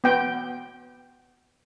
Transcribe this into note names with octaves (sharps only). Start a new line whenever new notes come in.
B3 G5